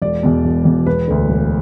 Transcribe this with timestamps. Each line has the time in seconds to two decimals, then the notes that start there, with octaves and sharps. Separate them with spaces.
0.02 E1 D5
0.23 E2 B2
0.45 E1
0.65 E2 B2
0.86 E1 B4
1.08 D2 D3
1.29 E1